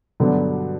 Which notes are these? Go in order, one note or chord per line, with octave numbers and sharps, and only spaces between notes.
G2 B2 D3 F#3 B3 D4